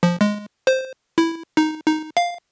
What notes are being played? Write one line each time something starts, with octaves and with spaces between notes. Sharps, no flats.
F3
G#3
C5
E4
D#4
D#4
F5